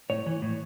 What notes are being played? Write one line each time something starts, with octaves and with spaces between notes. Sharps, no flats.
A2 C#5
E3
A2